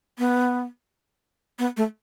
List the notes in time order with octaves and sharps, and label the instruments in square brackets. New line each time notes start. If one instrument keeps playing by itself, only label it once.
[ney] B3
B3
A3